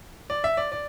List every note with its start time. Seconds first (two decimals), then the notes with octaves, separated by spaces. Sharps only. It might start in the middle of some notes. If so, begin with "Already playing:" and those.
0.30 D5
0.44 E5
0.57 D5
0.72 D5